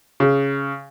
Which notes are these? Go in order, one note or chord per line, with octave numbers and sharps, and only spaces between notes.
C#3